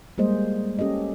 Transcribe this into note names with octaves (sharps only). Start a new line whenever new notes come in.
G3 G#3 A#3 G#4 C5 D#5
C#4 G4 A4 D#5